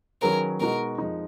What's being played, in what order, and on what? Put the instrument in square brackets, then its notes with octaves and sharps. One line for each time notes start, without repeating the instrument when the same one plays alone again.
[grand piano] D#3 F#3 C#4 G#4 B4 [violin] A#4
[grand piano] B2 G#3 D#4 F#4 [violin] A#4
[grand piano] F2 F3 G#3 D#4